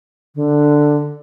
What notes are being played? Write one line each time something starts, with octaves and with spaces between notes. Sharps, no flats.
D3